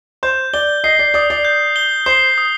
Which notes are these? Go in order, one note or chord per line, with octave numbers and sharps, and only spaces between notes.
C5 G6
D5 G7
D#5 C7
D5
D5 D#6
D5
G6
G7
C5 C7
D#6